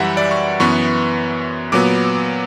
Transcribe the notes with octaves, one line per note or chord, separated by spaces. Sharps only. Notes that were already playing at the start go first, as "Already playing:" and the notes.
Already playing: F#2 E3 G3 E5 F#5 B5
D5
C#6
F#2 E3 B3 C#6
A#2 F#3 B3 D6